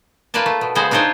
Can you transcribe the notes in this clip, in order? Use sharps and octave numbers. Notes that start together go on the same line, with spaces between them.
A#3 F4 B4 D5 F5 A5
A3
B2
C#3 G#3 B3 F#4 C5
C4 D4 D#4 F4 C5 C#5